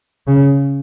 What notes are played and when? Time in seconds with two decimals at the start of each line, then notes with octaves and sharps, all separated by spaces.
0.27 C#3